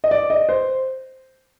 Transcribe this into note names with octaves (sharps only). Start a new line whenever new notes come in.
D#5
D5
D#5
C5